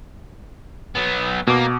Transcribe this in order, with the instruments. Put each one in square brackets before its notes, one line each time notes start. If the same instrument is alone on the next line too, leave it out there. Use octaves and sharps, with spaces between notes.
[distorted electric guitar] F#3 B3
[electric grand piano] B2 D6 [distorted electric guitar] A#3